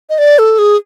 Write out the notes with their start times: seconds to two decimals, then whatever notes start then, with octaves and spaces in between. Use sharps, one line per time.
0.10 D#5
0.18 D5
0.39 A4
0.59 G#4